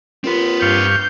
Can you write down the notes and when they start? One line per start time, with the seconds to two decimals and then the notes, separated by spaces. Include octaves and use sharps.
0.24 D#2 C4 F4 B4
0.62 G2 F5 C#6 G6